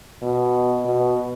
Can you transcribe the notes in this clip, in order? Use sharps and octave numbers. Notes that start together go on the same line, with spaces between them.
B2
B2